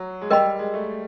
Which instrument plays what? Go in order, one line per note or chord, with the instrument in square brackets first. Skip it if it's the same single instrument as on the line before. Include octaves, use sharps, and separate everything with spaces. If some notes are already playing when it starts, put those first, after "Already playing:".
Already playing: [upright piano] F#3
G#3
[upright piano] G3 [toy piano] A#4 D#5 G5 B5
[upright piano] G#3
A3